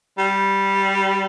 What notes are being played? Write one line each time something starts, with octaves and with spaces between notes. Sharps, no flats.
G3